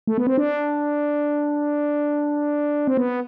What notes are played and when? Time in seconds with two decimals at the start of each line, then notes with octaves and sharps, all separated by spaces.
0.07 A3
0.18 B3
0.27 C4
0.38 D4
2.87 C4
2.97 B3